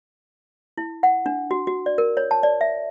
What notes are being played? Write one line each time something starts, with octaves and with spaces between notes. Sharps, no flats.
E4
F#5
D4
F#4
F#4
D5
A#4
C#5
A5
D5
E5